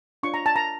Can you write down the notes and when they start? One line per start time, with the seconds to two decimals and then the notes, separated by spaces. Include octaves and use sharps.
0.23 D4 F4 C#5 C#6
0.34 A#5
0.46 A5
0.56 A#5